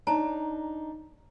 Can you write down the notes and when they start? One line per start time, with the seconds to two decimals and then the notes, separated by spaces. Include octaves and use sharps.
0.07 D4 D#4 C#5 A5 A#5